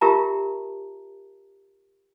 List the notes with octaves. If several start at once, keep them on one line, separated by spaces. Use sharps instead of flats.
F4 G4 A#4 E5 A5 A#5